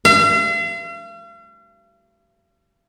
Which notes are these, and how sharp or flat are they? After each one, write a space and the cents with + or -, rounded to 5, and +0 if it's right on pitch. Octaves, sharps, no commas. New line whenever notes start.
F5 -45